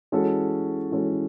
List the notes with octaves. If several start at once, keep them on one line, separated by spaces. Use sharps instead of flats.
E3 G#3 C#4 F#4 A4
E3 G#3 C#4 F#4 A4